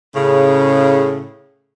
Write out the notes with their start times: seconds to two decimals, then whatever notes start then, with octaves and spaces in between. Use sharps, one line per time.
0.15 A2 C#3